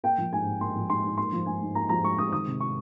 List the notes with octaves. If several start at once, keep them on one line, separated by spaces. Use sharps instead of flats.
A#3 G5
F3
G#2 G#5
G#2
A#3 C6
F3
G#2 C6
G#2
A#3 C6
F3
G#2 G#5
G#2
A#3 A#5
F3 A#5
G#2 C#6
G#2 D#6
D#3 D#6
C3
C#6